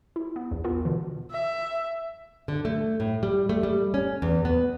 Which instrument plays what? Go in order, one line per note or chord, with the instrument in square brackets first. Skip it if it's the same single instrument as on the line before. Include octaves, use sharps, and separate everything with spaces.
[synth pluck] E4
B3
A#1 E2
B3 F4 A#4
B2 D3 E3
[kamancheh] E5
[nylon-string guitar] D3
A3
A2
G3
A3
G3
C#4
E2
B3